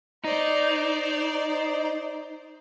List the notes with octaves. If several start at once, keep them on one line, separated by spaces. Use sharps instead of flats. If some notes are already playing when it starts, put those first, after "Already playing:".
D#4 C5 D5